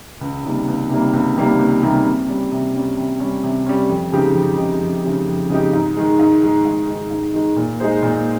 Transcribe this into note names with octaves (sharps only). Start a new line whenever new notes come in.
C#2
C3 D#3 G3 A#3
C#2
C3 D#3 G3 A#3
C#2
C3 D#3 G3 A#3
C#2
C3 D#3 G3 A#3
C3
G3 C#4
C3
G3 C#4
C3
G3 C#4
C3
G3 C#4
F2
C#3 G#3 D#4 G4
F2
C#3 G#3 D#4 G4
F2
C#3 G#3 D#4 G4
F2
C#3 G#3 D#4 G4
G#2
D#3 G#3
G#2
D#3 G#3
G#2
D#3 G#3
G#2
D#3 G#3
A#2
G#3 D#4 G#4 C5
A#2